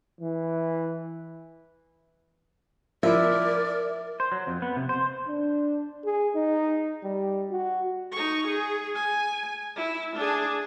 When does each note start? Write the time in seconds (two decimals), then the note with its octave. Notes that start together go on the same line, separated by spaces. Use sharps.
0.21 E3
3.03 F3 E4 A#4 D5 E5
4.20 C5
4.32 F#3
4.47 F2
4.62 B3
4.76 C3
4.89 C5
5.28 D4
6.05 G#4
6.35 D#4
7.03 G3
7.50 F#4
8.12 D#4 C#6
8.47 G#4
8.95 G#5
9.76 E4
10.16 D4 G#4